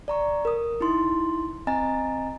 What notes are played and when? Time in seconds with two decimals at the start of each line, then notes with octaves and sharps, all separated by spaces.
0.08 D5 A#5 C#6
0.45 A#4 D#6
0.81 D#4 E4 C6
1.67 C4 D#5 G#5 A#5 A6